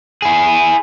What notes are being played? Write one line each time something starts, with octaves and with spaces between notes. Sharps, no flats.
E4 G#4